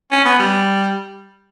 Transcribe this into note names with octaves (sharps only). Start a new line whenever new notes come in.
C#4
B3
G3